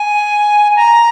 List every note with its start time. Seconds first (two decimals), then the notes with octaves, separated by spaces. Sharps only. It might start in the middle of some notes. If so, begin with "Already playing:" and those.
Already playing: G#5
0.76 A#5